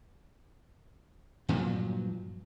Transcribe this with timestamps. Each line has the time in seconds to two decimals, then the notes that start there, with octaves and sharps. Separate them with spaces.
1.49 G2 A#2 F3 F#3